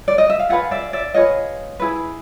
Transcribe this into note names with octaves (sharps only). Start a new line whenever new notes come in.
D5
D#5
E5
F5
F4 G#4 B4 E5 F#5
D5 E5
D5 E5
F4 G#4 B4 C#5 D#5
E4 G#4 B4